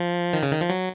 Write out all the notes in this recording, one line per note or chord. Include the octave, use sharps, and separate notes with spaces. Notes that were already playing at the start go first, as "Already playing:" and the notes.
Already playing: F3
D#3
C#3
D#3
F3
F#3